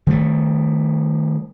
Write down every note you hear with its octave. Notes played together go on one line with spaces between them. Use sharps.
D#3 G3 A3